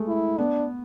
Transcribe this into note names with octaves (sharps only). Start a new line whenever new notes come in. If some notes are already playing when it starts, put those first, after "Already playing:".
Already playing: G#3 A3
E4
B3 D4